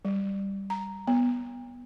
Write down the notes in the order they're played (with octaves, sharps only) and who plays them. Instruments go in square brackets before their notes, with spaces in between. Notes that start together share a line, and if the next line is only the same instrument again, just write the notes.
[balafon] G3
A#5
B3